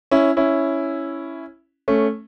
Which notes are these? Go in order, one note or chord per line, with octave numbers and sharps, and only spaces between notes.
C#4 E4
C#4 E4
A3 C#4